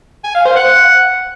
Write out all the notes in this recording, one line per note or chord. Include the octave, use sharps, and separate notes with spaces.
G#5
F5
C5
F#5